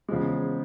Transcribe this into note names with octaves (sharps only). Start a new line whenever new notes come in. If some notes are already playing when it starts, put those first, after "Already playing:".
E2 C#3 F3 G#3